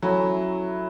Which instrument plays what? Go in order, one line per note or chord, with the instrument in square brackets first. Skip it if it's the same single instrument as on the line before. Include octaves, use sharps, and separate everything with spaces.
[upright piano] F#3 [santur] A3 C#4 E4